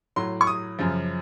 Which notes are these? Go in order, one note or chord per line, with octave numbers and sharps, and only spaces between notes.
A2 F#3 C6
C#6
D#6
F#2 C#3 F3